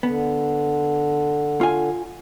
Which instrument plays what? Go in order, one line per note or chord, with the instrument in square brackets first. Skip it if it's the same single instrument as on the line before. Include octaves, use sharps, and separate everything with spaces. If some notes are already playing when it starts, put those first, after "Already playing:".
[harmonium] D3 [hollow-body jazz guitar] B3
[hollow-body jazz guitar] F4 G#5